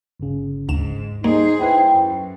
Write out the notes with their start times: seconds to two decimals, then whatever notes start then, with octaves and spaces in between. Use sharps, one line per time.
0.20 G1 C#3
0.69 D2 G#2 E7
1.24 G3 A#3 D#4 G#4 C5
1.61 E4 B4 G5
1.92 F#2